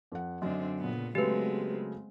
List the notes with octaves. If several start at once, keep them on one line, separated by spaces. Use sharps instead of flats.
F2 F#5
F#2 D3 C4 D4 D#5
A#2 C#3 B3
C#3 F#3 G#3 A3 B3 C4 G4 B4